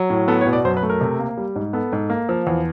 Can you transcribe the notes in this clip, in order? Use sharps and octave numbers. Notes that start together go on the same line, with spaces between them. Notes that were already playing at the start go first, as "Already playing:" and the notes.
Already playing: F#3
A2
B3 A4
C#5
B2
D5
F#2 C5
B4
A3
A#4
C3
A#3
G3
G#2
B3 A4
G#2
A#3
F3
E2